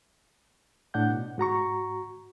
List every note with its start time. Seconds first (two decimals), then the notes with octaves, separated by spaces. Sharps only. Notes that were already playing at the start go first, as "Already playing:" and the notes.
0.94 A2 D4 F#5 G6
1.10 B2
1.38 G#2 F#4 A#5 C#6